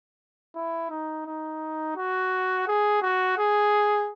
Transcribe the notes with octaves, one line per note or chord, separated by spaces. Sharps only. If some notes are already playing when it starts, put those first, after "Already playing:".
E4
D#4
D#4
F#4
G#4
F#4
G#4